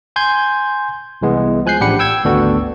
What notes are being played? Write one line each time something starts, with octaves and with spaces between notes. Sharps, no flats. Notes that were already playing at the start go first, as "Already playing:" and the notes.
G#5 C6 G6 G#6
C2 E3 G#3 B3
F3 G#5 F#6 G6 C7
A1 D4 G4 F#5 B5 C#7
G5 E6 G#6
G#1 D2 B3 D4 F#4 A4